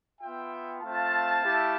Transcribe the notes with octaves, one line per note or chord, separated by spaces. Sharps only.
B3 F4 E5 G5
A3 C4 F4 F5 A5
A3 E4 G4